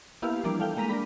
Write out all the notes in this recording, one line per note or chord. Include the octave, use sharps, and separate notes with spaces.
A#3 B3 E4 G4 F5
E3 F3 G3 A#3 D4 D5
A3 F5 G5
G#3 A#3 A#5 B6 D#7 F7
D4 A#4 B5